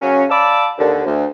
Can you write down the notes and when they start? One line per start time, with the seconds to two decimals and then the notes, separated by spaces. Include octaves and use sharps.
0.02 C#3 F#3 A#3 C#4
0.29 D5 F5 A5 B5 D6 E6
0.78 D#2 D3
1.05 D2